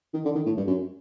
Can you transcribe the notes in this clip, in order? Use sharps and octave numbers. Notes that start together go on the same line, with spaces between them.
D#3
D3
D#3
A2
G2
F#2